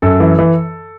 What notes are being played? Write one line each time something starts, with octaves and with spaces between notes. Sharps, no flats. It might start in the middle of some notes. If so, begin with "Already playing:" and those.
F#2 A4
E3
E3